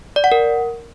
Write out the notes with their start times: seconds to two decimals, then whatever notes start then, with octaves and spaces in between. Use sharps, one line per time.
0.16 D5
0.24 F#5
0.32 A#4